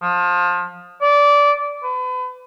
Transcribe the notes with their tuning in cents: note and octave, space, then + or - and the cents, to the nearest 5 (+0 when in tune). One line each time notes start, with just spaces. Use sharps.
F3 +25
D5 -20
B4 +35